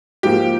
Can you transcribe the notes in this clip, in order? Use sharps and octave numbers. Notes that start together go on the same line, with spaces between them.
G#2 F3 A#3 G4